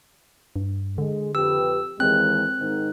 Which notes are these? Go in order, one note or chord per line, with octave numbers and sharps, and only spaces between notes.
G2
D3 G#3
F2 G4 B4 E6
D#2 E3 G#3 C4 F#6
G#2 D#3